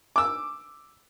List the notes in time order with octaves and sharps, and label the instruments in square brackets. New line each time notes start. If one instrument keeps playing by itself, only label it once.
[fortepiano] D6 E6